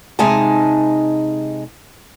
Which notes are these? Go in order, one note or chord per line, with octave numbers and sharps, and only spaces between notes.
C3 G#3 D#4 D#5 G#5 A5